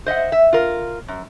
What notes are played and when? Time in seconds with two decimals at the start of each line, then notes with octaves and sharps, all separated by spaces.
0.06 C5 D#5 E5 F#5
0.32 E5
0.53 F4 A#4
1.08 F#2